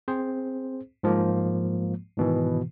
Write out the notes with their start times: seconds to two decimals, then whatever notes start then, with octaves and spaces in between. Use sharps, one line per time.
0.08 C4 G#4 C5
1.03 G#2 F3 G#3 A#3
2.17 G#2 B2 D#3 E3